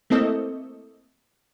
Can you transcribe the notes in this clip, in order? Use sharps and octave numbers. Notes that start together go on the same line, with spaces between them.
A3 A#3 C4 E4 A4 D#5